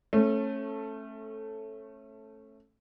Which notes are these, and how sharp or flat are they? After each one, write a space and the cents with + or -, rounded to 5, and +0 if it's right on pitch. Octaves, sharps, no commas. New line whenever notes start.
A3 +0 C#4 -30